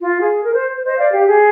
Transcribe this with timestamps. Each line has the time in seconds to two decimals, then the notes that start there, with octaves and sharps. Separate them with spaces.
0.01 F4
0.22 G#4
0.43 A#4
0.53 C5
0.74 C5
0.84 C5 D#5
0.98 D5 F5
1.13 G4
1.27 G#4